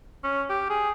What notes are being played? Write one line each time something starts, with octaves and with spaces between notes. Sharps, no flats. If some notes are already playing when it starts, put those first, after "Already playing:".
C#4
G4
G#4